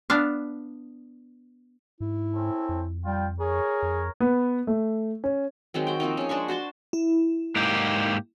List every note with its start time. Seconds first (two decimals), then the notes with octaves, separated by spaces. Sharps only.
0.10 B3 D4 F5
2.00 G#2 E4
2.34 C4 C#4 A4
2.69 F2
3.06 G3 F4 G5
3.40 G#4 A#4 C#5
3.83 F2
4.20 B3
4.67 A3
5.24 C#4
5.74 D#3 F#3 G#3 C4
5.87 F#4 G5
6.00 F3 A#3 C4 D#4
6.17 C#4 G#4
6.29 G#3 D4 C5 C#6
6.48 F#4 C5 A5 C6
6.93 E4
7.56 G#2 A#3 G4